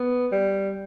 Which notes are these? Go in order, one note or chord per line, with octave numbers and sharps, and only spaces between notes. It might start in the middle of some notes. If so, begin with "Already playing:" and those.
Already playing: B3
G3